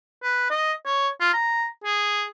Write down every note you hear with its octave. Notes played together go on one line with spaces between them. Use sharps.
B4
D#5
C#5
F4
A#5
G#4